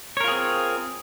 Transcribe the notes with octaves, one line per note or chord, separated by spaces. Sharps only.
C4 F4 G#4 A#4 C#5